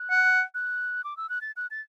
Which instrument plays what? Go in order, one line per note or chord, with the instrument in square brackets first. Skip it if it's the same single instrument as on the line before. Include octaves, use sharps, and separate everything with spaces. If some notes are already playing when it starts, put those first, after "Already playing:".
Already playing: [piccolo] F#6
[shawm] F#5
[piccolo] F#6
D6
E6
F#6
A6
F#6
A6